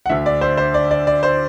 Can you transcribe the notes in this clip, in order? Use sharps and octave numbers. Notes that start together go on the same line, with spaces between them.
F#5
D2 D3 E5
D5
C5
C5
D5
D5
D5
C5